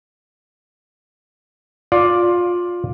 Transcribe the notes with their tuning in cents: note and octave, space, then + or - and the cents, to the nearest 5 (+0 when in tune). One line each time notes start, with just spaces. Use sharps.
F4 +15 D5 +0